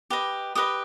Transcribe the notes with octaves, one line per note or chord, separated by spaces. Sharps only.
G4 B4 D#5
G4 B4 D#5 D#6